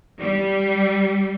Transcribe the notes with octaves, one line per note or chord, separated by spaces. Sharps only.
G3